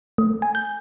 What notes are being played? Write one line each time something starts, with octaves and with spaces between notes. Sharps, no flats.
A3
G#5
G6